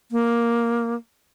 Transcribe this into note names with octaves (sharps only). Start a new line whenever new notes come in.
A#3